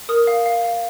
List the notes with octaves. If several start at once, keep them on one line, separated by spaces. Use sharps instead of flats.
A#4 D#6
F5
F5
F5